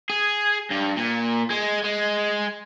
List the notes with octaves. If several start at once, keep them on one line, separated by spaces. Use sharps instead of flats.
G#4
G2
A#2
G#3
G#3